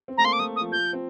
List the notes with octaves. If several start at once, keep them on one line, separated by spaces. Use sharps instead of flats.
C4
A3 A#5
A#3 C6
D6
A3 D#6
D#6
F3
F3 G6
C4